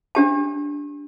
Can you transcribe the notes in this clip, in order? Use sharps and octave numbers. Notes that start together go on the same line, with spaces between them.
D4 G4 A5